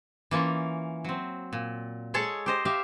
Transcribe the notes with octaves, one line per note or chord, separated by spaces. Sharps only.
E3 A#3 C#4 F4
F#3 C4
A#2
G#3 G#4 A4 C#5 A5
G4 C5 D#5
G4 E5 F5